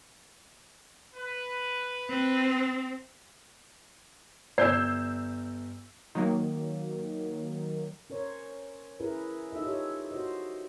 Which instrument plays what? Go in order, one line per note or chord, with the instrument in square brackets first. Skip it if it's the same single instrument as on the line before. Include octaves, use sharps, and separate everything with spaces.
[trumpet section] B4
[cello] C4
[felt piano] G1 [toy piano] D5 [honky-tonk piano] E6 G6 C7
[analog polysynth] D#3 F#3 A#3
[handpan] C#4 A#4 C5 C#5
C#4 E4 G#4 A#4 B4
D#4 F4 A4 E5
G4 C#5
F#4 C5 D#5